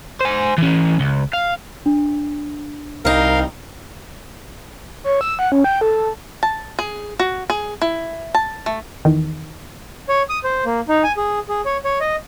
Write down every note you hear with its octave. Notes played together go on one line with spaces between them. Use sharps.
C5 G#5
E3 C#4
C#2
F5
D4
C2 G3 D#4 A#4 F5
C#5
E6
F#5
C#4
G5
A4
A5
G#4
F#4
G#4
E4
A5
A3
E2 D#3
C#5
D#6
C5
A#3
D#4
G#5
G#4
G#4
C#5
C#5
D#5